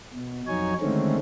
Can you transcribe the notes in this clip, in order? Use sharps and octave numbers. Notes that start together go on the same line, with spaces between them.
B2
F2 F#3 D#4 C#5 G#5
D3 D#3 G#3 A3 C4 C#4